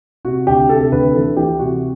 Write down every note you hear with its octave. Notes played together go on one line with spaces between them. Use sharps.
C3 F#4
D2 G4
C3 A4
A4
D2 B4
E3 A4
E3 G4
C3 F#4